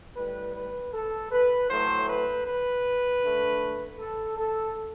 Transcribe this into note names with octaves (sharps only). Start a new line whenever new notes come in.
A2 G3 B4
B4
A4
B4
A2 F#3 A3 C5
B4
B4
D3 A3
A4
A4